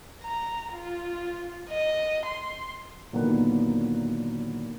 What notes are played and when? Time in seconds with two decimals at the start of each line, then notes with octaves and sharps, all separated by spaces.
0.23 A#5
0.74 F4
1.69 D#5
2.26 C6
3.13 A#2 D3 D#3 F#3 A#3 B3